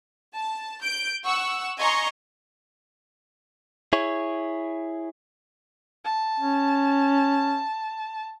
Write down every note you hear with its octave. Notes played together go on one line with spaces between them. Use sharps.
A5
G6 D7
F#5 C#6 E6
D#5 G#5 A#5 C6 C#6
E4 G#4 C#5
A5
C#4